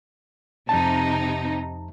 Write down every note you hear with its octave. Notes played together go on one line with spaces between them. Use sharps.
F2 C3 D#4 A5